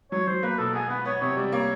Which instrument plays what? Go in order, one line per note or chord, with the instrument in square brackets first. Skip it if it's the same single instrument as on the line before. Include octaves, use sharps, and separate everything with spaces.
[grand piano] F#3 [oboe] C#5
[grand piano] F#3 [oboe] C5
[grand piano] A#3 [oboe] B4
[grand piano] B2 [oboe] A4
[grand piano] B3 [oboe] G#4
[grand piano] B3 [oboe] B4
[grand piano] B3 [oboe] C#5
[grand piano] C3 [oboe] C#5
[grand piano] G3 [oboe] D5
[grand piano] A#3 [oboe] C#5